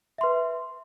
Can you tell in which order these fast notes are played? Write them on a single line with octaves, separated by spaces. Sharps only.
E5 C6 B4